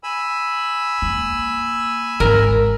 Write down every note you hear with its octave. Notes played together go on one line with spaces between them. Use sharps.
G#5 B5 E6
A#3
G#1 A#4